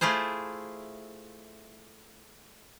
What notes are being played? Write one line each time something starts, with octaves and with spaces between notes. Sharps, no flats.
A3 E4 F4 G#4 C5